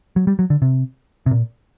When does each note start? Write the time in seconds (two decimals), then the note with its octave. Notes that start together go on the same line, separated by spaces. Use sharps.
0.16 F#3
0.27 G3
0.39 F#3
0.50 D3
0.62 C3
1.26 C3
1.31 A#2